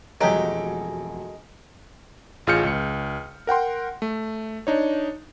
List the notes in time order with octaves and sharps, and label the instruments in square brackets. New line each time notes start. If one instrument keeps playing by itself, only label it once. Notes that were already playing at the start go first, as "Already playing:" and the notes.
[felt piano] E1 F2 D7 [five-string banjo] F#3 A3 G4 [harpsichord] G#3
[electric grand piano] A1 F4 G#4 F6 G6 C#7
C#2 C#7
A#4 F#5 G5 C6
A3
D4 D#4 C#5